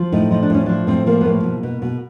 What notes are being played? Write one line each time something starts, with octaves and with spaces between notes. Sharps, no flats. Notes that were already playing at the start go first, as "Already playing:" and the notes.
Already playing: F3
A2 D#4
F3 D#4
D4
A2 C#4
F3 D4
A2 C4
F3 A#3
B3
A2 A#3
B2
B2
B2